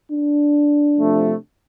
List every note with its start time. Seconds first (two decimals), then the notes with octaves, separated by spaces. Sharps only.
0.12 D4
0.96 C3 F3 A3